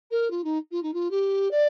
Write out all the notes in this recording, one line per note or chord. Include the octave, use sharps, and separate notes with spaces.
A#4
F4
D#4
F4
D#4
F4
G4
D5